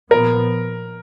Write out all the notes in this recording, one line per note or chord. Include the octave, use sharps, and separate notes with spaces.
A#2 F3 B3 A#4